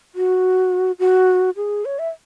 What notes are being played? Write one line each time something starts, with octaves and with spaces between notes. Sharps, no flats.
F#4
F#4
G#4
C#5
E5